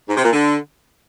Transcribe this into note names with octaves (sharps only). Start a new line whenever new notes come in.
G#2
C3
A#2
D3